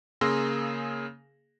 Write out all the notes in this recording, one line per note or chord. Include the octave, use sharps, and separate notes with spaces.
C#3 A#3 G#4 C6 E6 A#6